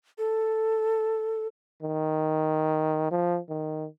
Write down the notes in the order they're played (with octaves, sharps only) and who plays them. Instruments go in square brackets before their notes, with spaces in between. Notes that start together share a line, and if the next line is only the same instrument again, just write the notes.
[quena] A4
[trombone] D#3
F3
D#3